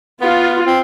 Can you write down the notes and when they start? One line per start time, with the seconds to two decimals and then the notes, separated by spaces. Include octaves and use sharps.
0.21 B3 F4
0.67 C4